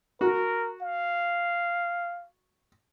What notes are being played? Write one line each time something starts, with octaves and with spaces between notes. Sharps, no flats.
F#4 A#4
F5